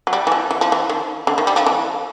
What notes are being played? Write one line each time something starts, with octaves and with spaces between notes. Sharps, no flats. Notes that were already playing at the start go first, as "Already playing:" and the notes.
F#3
G3
E3
F3
E3
F3
E3
D#3
D3
D#3
G3
F3
E3